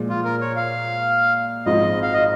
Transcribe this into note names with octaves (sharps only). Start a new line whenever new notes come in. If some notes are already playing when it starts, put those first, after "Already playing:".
Already playing: A#2 F3 G#3
F4
A#4
C#5
F5
G#1 G#2 F3 D#5
F5
D#5